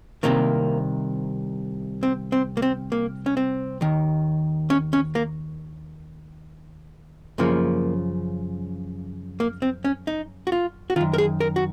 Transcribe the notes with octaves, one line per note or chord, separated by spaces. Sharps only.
C2 C3 D#3 A#3
C4
C4
A#3
C4
A#3
C#4
C4
D#2 D#3
C#4
C#4
A#3
F#2 C#3 F3 A#3
A#3
C4
C#4
D#4
F#4
F4
F#4
F#2 D#3 F4
A#4
G#4
A#4
F#4